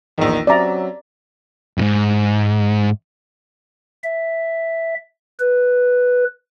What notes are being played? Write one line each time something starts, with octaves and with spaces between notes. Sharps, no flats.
A#1 E2 D#3
F#3 C4 C#4 D5 E5 A#5
F2 G#2
E5
B4